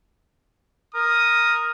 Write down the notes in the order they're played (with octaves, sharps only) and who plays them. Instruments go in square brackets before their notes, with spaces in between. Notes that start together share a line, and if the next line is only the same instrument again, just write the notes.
[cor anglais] A#4 [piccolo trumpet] D#6